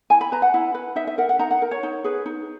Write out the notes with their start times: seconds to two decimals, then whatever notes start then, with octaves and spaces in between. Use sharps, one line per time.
0.10 E4 G#5
0.21 B5
0.32 B4 A#5
0.42 F#5
0.54 E4
0.74 B4
0.96 D#4 E5
1.07 E5
1.18 A#4 F#5
1.29 F#5
1.39 D#4 A#5
1.51 F#5
1.62 A#4
1.71 C#5
1.83 D#4
2.04 G#4 B4
2.26 D#4